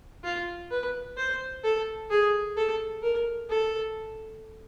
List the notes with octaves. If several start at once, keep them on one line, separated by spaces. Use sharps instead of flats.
F4
B4
C5
A4
G#4
A4
A#4
A4